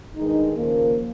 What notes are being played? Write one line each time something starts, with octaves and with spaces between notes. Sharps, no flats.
G2 D#3 G#3 D#4
D#2 C#3 F3 A#3